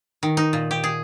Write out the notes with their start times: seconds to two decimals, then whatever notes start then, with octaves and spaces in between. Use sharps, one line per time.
0.23 D#3
0.37 D#4
0.53 A#2
0.71 G4
0.84 G#4